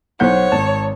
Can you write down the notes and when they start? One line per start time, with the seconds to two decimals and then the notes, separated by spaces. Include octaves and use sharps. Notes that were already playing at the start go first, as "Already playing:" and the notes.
0.20 B1 C5 C#5 F#5 G6
0.52 G#1 A5